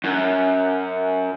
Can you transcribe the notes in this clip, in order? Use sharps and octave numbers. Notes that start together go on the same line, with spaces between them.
F#2